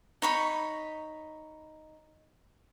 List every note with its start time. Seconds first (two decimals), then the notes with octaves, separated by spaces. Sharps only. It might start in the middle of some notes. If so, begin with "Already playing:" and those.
0.22 D#4 C#5 B5